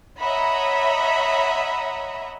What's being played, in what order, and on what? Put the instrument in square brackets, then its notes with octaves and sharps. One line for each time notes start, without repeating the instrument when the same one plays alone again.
[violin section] C#5 D#5 E5 F#5 A#5 B5